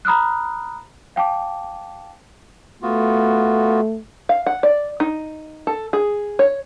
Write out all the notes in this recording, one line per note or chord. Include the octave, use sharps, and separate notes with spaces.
A#5 B5 D#6 F6 F#6
F5 G5 A5 D6
A3 B3 F4 F#4
F5
F#5
D5
D#4
A4
G#4
C#5